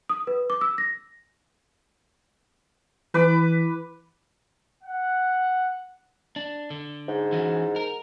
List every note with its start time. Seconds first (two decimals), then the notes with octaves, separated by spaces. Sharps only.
0.09 D#6
0.27 B4
0.50 D6
0.61 E6
0.78 A#6
3.14 E3 B4 D6
4.84 F#5
6.36 D4
6.70 D3
7.08 G#2
7.32 E3 C#4 F#4
7.76 A#4